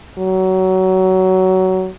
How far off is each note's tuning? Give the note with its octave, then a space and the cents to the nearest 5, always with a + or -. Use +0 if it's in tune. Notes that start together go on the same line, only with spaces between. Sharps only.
F#3 +20